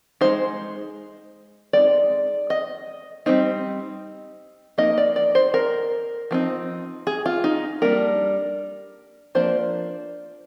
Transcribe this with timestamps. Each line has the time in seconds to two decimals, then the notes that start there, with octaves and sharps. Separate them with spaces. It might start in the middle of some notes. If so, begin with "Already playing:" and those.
0.21 G#3 D#4 C5
1.73 G#3 C4 D#4 D5
2.50 D#5
3.26 G3 C4 D#4
4.78 F3 A#3 D#4 D#5
4.98 D5
5.16 D5
5.35 C5
5.54 A#4
6.31 F3 C4 D#4
7.07 G#4
7.26 F4
7.44 D#4
7.82 G3 A#3 D4 A#4
9.35 F3 A#3 D4 C5